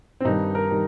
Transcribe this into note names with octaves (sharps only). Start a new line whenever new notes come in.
C4
G2 D#3 G3 D#4
A#4
D#3 G3